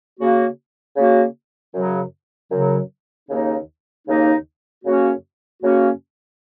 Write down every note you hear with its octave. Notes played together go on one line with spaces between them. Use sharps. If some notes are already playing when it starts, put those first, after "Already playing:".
C#3 A#3 F#4
C#3 A#3 F#4
F#2 C#3 F#3
F#2 C#3 F#3
D#2 C#3 A#3 D#4
D#2 C#3 A#3 D#4
F#2 C#3 A#3 C#4 F#4
F#2 C#3 A#3 C#4 F#4